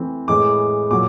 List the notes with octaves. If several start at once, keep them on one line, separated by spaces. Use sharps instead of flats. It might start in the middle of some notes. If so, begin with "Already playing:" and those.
Already playing: E3 A3 C4
A2 E3 G#3 D6
A#2 F#3 D6